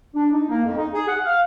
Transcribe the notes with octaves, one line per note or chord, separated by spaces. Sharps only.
D4
D#4
A#3
F2
D#4
G#4
F#5
F5